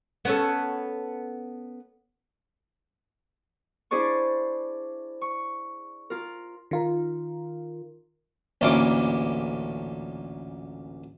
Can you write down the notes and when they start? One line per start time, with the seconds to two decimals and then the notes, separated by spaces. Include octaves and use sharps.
0.25 B3 C#4 A4
3.91 D4 E4 G#4 C5 D5 C#6
5.21 C#6
6.10 F4 A#4
6.71 D#3 F4 A#4
8.61 A1 D2 A#2 E3 A#4 D6